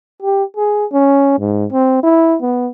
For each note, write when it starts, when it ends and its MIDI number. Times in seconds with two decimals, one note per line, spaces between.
0.23 0.44 67
0.57 0.86 68
0.92 1.39 61
1.40 1.66 44
1.72 2.00 60
2.03 2.36 64
2.42 2.69 59